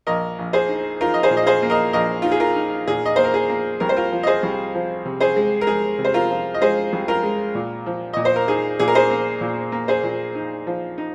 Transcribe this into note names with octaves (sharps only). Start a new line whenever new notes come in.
A#1 A#4 D#5
A#1
G#4 C5
D#4
D#4 F4 A#4
D#5
G#4 C5
A#2
D#5
G#4 C5
A#3
A#4 D#5
A#1 A#4 D#5
D#4 F4
G#4
F4 A#4
D#4
A#2 G#4
D#5
A#3 C5
A#4
G#4
A#3
C2 A#4
C5
F4 A#4
F3
D#5
G#4 C5
C2
F3
C3
G#4 C5
G#3
A#4
G#3 G#4
C3
C5
F4 A#4
F3
D#5
G#3 G#4 C5
C2
F4 A#4
G#3
A#2
F3
A#2 D#5
C5
A#4
D#4 G#4
A#2 G#4
A#4
G#4 C5
A#3
A#2
A#3
G#4 C5
A#2
D#4
F3
D#4